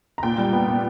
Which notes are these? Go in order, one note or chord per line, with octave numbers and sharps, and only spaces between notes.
A#5
A#2 G5
G3
B3
A#2